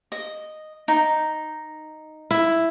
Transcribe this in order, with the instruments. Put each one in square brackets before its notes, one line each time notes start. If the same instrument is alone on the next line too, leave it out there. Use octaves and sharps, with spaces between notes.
[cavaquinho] D#5
D#4
[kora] E4